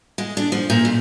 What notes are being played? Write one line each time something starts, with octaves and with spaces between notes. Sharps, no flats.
G#3
D4
F3
A#2
F2